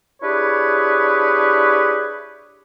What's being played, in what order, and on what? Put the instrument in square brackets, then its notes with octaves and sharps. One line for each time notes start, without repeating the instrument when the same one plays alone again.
[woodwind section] D4 E4 G4 G#4 B4 C#5